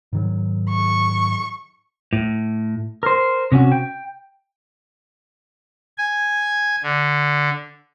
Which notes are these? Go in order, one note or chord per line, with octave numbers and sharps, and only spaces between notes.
G#2 D#3 F#3
C#6
A2
A#4 C5
C3 C#4 F#4
G5
G#5
D3